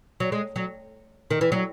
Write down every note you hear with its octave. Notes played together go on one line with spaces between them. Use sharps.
F#3
G#3
F#3
D#3
E3
F#3